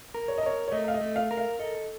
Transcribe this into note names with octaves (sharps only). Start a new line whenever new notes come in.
A#4
C#5
D#5
A#4 C#5
C#5
A3 D#5
F5
D#5
A3
F5
A#4
F5
A4 D#5